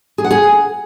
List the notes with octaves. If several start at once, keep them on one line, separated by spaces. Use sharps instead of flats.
G#4
F#5
G#4